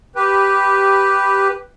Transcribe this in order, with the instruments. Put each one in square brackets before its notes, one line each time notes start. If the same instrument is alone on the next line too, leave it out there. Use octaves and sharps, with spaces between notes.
[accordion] G4 B4